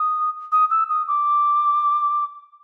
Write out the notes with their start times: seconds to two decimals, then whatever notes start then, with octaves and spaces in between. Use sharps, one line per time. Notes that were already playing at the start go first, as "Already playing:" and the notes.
Already playing: D#6
0.52 D#6
0.71 E6
0.90 D#6
1.08 D6